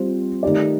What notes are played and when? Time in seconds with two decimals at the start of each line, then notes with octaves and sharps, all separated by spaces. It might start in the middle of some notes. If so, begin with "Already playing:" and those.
Already playing: G3 C4 F4 C5
0.43 D#3 A3 D#4 G4 D5